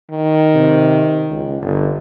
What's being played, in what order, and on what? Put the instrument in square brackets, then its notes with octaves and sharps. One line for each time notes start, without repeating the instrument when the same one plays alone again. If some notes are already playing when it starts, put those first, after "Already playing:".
[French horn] D#3
[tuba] C3
C#2
G1